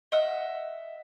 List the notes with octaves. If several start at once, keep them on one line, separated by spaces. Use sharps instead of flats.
D#5 E5 F#5 E6